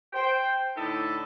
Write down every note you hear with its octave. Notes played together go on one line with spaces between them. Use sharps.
C5 G5
A2 D3 D#4 E4 A4